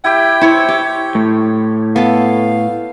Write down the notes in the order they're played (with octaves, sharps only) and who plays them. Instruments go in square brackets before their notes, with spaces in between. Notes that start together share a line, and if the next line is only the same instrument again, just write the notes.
[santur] E4 G4 [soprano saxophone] G5
[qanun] E4 [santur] C5 C#5 C#6
[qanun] G4 [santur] C#5
[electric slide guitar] A2
[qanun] B3 A4 [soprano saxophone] F5